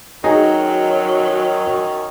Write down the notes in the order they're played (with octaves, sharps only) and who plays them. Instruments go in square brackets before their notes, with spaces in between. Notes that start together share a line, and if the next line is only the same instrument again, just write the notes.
[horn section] F#2 D#3 C#5 [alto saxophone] F#3 [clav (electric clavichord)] D#4 [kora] G#4